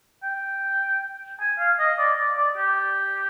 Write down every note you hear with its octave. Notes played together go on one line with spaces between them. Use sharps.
G5
G#5
F5
D#5
D5
D5
D5
G4